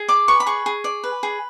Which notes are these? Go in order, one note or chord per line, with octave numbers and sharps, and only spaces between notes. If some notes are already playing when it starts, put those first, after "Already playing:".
Already playing: G#4
D5 D6
B4 C#6
B5
G#4 C#6
G#4
D5
B4
G#4